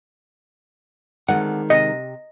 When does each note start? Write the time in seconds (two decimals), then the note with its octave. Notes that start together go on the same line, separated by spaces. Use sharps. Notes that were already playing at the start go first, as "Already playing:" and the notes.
1.28 D2 D#3 G#3 C4 F#5
1.70 C3 D#5